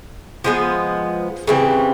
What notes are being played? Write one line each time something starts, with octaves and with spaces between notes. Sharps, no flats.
F3 G#3 B3
C#3 E3 G3 C4